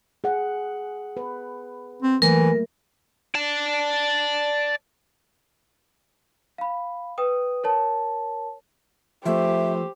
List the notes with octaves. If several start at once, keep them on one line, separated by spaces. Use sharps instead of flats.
G#4 F#5
B4
C4
E3 F#3 A3 A#3 A#4
D5 A5
F5 B5
B4 G5 D#6
A#4 C#5 A5
F3 A3 G4 C5 E5